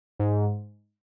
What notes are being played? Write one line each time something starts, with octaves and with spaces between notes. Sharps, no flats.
G#2